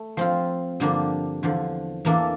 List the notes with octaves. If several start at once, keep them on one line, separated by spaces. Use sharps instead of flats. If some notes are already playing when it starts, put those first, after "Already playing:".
Already playing: A3
F3 C4 F4
G2 D3 F3 A#3 D4
E2 D3 F3
E2 E3 A#3 D4 A4